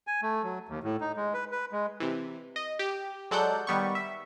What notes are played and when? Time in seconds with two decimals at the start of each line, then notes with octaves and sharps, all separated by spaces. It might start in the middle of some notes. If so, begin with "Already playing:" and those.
0.07 G#5
0.22 A3
0.44 F#3
0.69 D#2
0.84 A2
1.01 D#4
1.17 G#3
1.34 B4
1.52 B4
1.72 G#3
2.00 C3 E3
2.56 D#5
2.79 G4
3.31 F#3 G#3 A4 D5 F#5 G6
3.67 D#3 G3 B3 C#6
3.95 E5